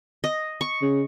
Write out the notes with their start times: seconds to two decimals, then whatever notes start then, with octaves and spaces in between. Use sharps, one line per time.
0.24 D#5
0.61 C#6
0.82 C#3